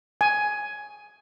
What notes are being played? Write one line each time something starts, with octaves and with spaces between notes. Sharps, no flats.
G#5